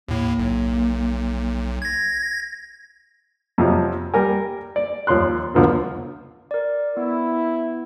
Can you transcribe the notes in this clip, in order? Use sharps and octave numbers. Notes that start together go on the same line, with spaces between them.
D#2 A2 A#3
B1
G#6 A#6
F2 C3 F3 F#3
G3 A#4 G#5
D5
D#2 F3 C#5 C6 F#6
C#2 D3 F3 F#3 B3
A#4 D5
B3 E4